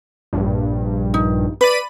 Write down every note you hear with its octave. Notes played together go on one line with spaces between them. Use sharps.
A#1 G2
D#4
B4 D5 B5 D#7